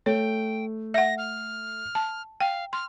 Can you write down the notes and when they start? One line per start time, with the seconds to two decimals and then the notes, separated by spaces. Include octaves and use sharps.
0.06 A3 C#5 G5
0.94 E5 F#5 A#6
1.18 F6
1.95 A5
2.40 F5 G5
2.73 C6 F6